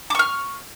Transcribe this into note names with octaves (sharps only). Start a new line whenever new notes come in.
C#6 D6 F6